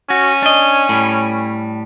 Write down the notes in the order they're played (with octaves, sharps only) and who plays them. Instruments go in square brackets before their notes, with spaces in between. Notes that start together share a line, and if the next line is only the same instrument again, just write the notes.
[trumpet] C#4 [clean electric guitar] F#4
[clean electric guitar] D4 D#5
A2 G3